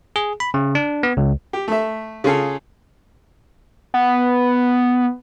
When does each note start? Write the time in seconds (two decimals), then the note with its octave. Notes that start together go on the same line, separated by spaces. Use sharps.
0.16 G#4
0.40 B5
0.54 C#3
0.75 D4
1.03 B3
1.17 C#2
1.53 G4
1.68 A3 E5
2.24 C#3 F4 G#4 A4
3.94 B3